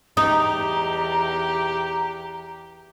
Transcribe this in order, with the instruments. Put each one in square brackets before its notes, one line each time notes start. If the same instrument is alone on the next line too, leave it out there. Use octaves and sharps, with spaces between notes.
[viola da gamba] E2 G4 [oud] D#4 [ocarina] A#5